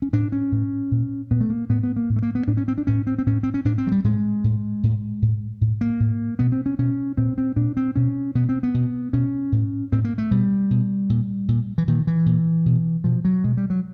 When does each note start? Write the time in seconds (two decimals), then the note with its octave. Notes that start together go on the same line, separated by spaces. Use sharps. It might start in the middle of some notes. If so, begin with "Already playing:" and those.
0.02 C#4
0.13 A2 D4
0.32 C#4
0.52 A2
0.91 A#2
1.31 A#2 B3
1.41 A3
1.50 A#3
1.69 A2 B3
1.83 B3
1.96 A#3
2.10 A2
2.16 A3
2.22 A#3
2.35 B3
2.47 A2 D4
2.57 C#4
2.68 C4
2.78 D4
2.87 A2 C#4
3.07 C4
3.18 C4
3.26 A2 C#4
3.43 C4
3.54 C#4
3.65 A2 D4
3.78 C4
3.87 F#3
3.92 G3
4.04 A2 G#3
4.44 A2
4.83 A2
5.22 A2
5.61 A2
5.81 A#3
6.00 A2
6.39 B2 B3
6.52 C4
6.66 C#4
6.79 B2 C#4
7.17 A#2 C4
7.38 C4
7.56 A#2 D4
7.77 C4
7.96 B2 C#4
8.35 B2 B3
8.49 C4
8.63 B3
8.74 B2
9.13 B2 C#4
9.52 A2
9.92 A2 C4
10.05 A#3
10.18 A3
10.31 B2 G3
10.71 B2
11.10 A#2
11.48 A#2
11.78 E3
11.88 A#2 D#3
12.07 E3
12.26 A#2
12.66 B2
13.04 B2 F3
13.25 F#3
13.44 B2 G#3
13.57 G3
13.70 F#3